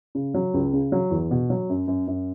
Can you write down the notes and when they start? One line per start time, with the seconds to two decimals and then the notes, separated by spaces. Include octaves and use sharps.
0.15 C#3
0.34 F#3
0.54 C#2
0.73 C#3
0.92 F#3
1.11 E2
1.31 B2
1.50 F#3
1.70 F#2
1.88 F#2
2.07 F#2